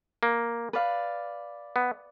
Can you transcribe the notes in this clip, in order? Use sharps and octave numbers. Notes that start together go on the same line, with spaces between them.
A#3
B4 D5 F5
B3